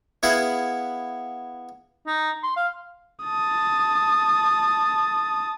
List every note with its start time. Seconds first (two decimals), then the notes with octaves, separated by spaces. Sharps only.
0.23 B3 E4 G#4 F5 F#5
2.06 D#4
2.43 C6
2.56 F5
3.25 A5 D#6